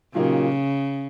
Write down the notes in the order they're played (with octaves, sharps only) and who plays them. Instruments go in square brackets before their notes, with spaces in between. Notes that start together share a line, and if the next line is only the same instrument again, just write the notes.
[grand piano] A#2 F#3 A#3 D#4 G4 [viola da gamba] C#3